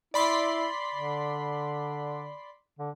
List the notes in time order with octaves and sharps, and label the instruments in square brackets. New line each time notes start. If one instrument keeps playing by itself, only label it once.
[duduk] E4 [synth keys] D5 B5 C6
[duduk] D3
D3